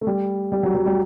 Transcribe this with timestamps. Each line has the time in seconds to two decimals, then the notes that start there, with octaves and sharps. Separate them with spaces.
0.01 A3
0.07 G3
0.52 G3
0.63 F#3
0.75 F#3
0.86 G3